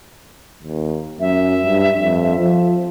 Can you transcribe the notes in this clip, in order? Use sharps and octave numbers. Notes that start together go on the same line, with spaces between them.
D#2
F#2 E5
G2
F2
F3